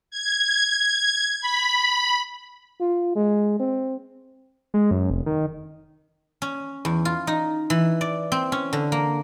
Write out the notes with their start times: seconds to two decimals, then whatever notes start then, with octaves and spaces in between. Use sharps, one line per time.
0.11 G#6
1.41 B5
2.80 F4
3.15 G#3
3.60 C4
4.74 G#3
4.91 F#2
5.10 F1
5.26 D#3
6.42 C#4
6.85 E2
7.05 F4
7.27 D#4
7.70 E3
8.01 D5
8.32 C4
8.52 C#4
8.73 D3
8.92 A#3